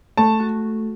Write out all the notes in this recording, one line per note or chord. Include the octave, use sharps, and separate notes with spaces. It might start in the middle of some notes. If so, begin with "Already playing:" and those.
A3 A5
F#4